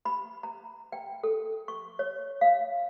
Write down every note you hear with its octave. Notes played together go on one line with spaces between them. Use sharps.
B5
A#5
G5
A4
C#6
C#5
F5